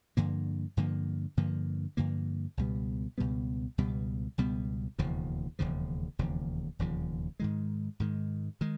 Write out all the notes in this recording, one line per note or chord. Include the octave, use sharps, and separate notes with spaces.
G2 D3 F3 A#3
G2 D3 F3 A#3
G2 D3 F3 A#3
G2 D3 F3 A#3
C#2 B2 G3 B3
C#2 B2 G3 B3
C#2 B2 G3 B3
C#2 B2 G3 B3
E1 D#2 C#3 F3
E1 D#2 C#3 F3
E1 D#2 C#3 F3
E1 D#2 C#3 F3
G#2 D#3 G#3
G#2 D#3 G#3
D#3 G#3